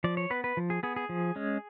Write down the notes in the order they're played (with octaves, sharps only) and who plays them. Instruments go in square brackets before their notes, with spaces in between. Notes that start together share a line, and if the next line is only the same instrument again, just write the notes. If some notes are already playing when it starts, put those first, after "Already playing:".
[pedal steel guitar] F3 D5
C#5
B3 B4
B4
F3
G#4
B3 G#4
G#4
F3
G#3 C#4